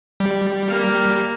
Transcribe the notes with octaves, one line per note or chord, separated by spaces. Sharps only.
G3
A#3 F5